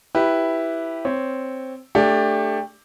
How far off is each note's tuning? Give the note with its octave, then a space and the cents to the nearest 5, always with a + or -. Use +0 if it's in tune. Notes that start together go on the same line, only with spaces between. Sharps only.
E4 +0 G4 +0 B4 -5
C4 +0 C#5 +5
A3 +0 D4 +0 G4 +20